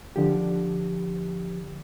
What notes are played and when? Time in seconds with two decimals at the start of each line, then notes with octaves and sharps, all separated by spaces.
0.16 D3 F3 G4